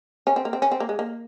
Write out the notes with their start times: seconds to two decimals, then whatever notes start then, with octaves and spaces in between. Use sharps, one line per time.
0.27 C#4
0.36 C4
0.45 A#3
0.53 C4
0.62 C#4
0.72 C4
0.80 A#3
0.89 G#3
0.99 A#3